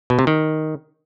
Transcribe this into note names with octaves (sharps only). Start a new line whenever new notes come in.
B2
C3
D#3